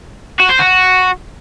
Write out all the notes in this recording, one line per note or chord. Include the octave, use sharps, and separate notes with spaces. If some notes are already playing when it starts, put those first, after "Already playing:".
F#4
C5
F#4